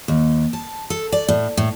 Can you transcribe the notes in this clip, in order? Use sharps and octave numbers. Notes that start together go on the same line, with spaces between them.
D#2
A5
A4
D5
A2
A2